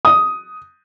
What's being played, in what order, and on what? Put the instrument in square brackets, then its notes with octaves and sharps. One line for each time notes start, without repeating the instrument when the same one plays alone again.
[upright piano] D#6